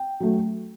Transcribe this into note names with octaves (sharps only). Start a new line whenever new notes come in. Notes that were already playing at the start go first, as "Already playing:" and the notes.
Already playing: G5
F#3 A3